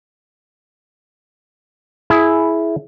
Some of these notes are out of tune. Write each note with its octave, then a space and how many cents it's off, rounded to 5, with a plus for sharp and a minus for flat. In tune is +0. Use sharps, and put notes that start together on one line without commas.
E4 +0 G#4 +20